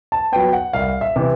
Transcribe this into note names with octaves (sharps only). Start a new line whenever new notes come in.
A5
F#3 B3 G5
F#5
C2 F5
E5
C3 E3